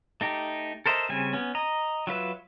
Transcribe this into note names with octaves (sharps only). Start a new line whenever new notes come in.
A3 D#4 G4
A4 A#4 C5 D#5 E5
C#3 G3 C4 C#4 G#5
B3 C#4
D#5 A#5
F#3 F4 B4 E5